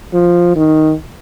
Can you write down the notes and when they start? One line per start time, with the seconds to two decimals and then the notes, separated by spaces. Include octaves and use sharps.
0.14 F3
0.56 D#3